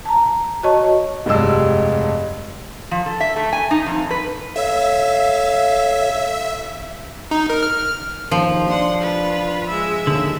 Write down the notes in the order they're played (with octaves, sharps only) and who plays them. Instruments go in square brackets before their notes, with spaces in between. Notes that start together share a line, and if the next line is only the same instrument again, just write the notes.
[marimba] A5 A#5
F#4 C#5 D#5 A5 C#6
[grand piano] F1 G2 G3 G#3 E6
[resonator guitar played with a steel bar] F3
A4
E5
A3
G#5
D#4
F2
B4
[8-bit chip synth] A4 C#5 [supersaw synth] E5 [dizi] F5
[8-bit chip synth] D#4
A#4
F6
[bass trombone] D#2 [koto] F3
[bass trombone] D4 [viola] F#5 C6
[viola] F4 B4
G#3 E5
[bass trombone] D#2 [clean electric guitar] D3